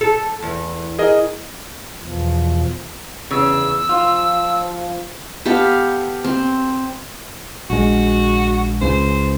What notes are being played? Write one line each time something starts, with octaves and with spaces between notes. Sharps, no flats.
A4
E2
G#4 A#4 D#5
E2 B2 F3
E2 C#3 E6
F3 F4
B3 G4 A4 F5
C4
A#1 G#3 F#4
C#2 C#3 C5